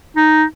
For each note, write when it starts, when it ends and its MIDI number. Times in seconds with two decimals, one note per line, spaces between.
0.17 0.44 63